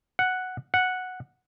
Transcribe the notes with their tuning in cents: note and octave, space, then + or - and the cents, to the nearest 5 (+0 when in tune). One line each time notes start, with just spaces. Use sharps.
F#5 +0
F#5 -5